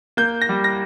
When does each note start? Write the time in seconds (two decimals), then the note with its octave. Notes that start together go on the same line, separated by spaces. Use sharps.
0.17 A#3 G6
0.41 A#6
0.49 G3
0.64 A#6